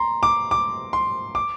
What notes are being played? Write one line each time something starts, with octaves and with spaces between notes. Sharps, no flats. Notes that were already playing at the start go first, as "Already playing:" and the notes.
Already playing: A#5 C6
D6
D6
C6
D6